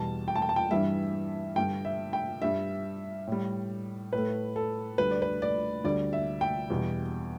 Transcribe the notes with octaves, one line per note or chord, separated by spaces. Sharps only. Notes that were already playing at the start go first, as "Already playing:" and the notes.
Already playing: E2 B2 G3 A5
G5
A5
G5
A5
G5
G2 E3 G3 E5
G2 D3 G3 G5
E5
G5
G2 G3 E5
A2 G3
A2 A3 B4
A4
D2 D3 G3 B4
D5
B4
D5
D2 D3 G3 D5
E5
G5
E2 B2 G3